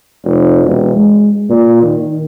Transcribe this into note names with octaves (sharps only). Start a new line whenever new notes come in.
F1
E1
G#3
A#2
D#3